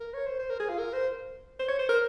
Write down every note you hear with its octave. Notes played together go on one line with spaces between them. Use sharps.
A#4
C#5
C5
C5
A#4
G#4
F4
A#4
C5
C5
C#5
C5
A#4